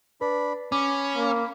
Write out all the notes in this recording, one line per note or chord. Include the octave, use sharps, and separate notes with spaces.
D4 B4 B5
C#4 B5 D6
A#3